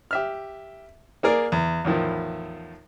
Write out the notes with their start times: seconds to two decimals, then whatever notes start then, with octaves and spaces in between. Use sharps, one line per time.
0.11 G4 E5 F6
1.23 A#3 G#4 A#4 D5
1.52 E2
1.85 E2 A2 D#3 F3